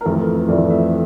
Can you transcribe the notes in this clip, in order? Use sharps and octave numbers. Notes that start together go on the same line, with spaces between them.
A#4
F2 E3 A3 A4
F2 E3 A3 D5
E5